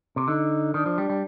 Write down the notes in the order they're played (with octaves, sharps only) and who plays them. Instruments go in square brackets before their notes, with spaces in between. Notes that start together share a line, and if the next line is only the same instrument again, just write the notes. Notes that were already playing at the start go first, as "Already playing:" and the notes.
[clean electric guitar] C3
[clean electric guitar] D3 [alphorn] D#4
[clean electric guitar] D#3 [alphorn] D4
[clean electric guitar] F3
G3
G3